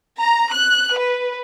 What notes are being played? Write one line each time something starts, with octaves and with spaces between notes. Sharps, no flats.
A#5
F#6
B4